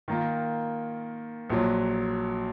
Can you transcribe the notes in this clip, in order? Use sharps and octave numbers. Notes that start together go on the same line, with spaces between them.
D#3 A#3 F4
A#1 A#2 F#3